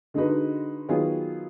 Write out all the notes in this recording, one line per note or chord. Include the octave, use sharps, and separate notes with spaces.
D3 G#3 D#4 F#4 B4
D#3 F#3 B3 F4 G#4